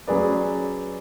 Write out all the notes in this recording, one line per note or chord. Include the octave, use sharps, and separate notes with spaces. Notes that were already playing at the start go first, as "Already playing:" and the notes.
F#3 C#4 G#4 B4 D5